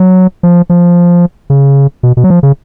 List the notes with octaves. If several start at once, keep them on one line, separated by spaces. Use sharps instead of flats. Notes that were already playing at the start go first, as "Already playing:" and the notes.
Already playing: F#3
F3
F3
C#3
B2
B2
F#3
F3
C#3